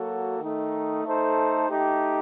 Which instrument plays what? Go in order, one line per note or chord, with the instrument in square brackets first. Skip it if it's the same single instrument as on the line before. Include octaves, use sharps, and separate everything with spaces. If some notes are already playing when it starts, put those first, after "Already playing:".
Already playing: [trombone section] F#3 A#3 F#4 A4
D#3 A3 D#4
A3 D#4 A4 C5
A3 D#4 G4